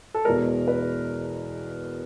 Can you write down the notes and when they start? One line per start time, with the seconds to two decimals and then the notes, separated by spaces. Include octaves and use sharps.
0.14 A4
0.25 E2 B2 G#3 A#4
0.68 B4